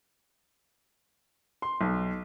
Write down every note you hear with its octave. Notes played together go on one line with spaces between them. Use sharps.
C6
B1